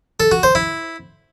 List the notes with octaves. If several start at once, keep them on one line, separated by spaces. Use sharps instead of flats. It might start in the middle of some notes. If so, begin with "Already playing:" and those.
A4
F#4
C5
E4